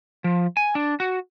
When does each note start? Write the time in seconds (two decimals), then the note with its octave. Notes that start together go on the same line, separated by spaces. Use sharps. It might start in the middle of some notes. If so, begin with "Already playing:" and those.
0.24 F3
0.57 G#5
0.75 D4
1.00 F#4